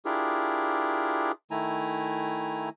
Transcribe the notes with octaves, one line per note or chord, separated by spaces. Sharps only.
D4 E4 F4 G4 G#4 A#4
D#3 A3 E4 G#5 A#5